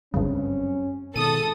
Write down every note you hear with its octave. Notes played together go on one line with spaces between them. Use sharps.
G1 C#2 F#2 G3 C4 C#4
G#1 B2 D#3 A4 D#6 D#7